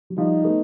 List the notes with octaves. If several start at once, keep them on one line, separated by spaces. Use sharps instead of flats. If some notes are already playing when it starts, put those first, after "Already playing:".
F#3
F3 G3 D#4
A3 B3